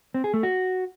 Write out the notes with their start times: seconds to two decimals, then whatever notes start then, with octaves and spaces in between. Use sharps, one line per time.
0.14 C4
0.24 G#4
0.34 A3
0.43 F#4